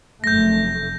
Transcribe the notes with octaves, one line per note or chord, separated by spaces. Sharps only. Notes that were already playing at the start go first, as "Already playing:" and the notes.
F1 F#2 A3 G6 A#6